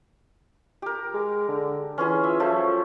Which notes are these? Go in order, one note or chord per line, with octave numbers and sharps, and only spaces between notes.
G4 A#4
G#3
D3
E3 C#4 F4 G#4
E5
F3 F#3 A3